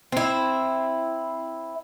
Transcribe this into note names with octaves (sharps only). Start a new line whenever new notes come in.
C4 E4